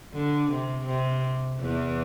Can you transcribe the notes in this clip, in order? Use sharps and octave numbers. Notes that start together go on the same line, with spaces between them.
D3
C3
C3
E2 E3